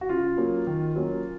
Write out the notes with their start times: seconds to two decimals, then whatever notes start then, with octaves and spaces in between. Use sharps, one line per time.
0.01 F#4
0.09 C#3 F4
0.37 F#3 A#3 C#4
0.67 D#3
0.96 F#3 A#3 C#4